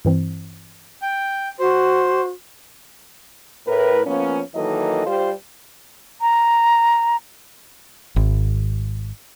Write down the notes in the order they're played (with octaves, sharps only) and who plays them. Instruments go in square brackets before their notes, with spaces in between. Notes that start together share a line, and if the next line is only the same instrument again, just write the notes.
[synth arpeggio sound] G2 E3 C4
[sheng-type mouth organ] G5
[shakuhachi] F#4 [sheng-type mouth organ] C5
[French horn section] A2 A#4 B4
F3 A#3 B3 C#4
D#3 E3 F#3 A#3 A4 D#5
G3 F4 G4 C5
[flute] A#5
[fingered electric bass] G#1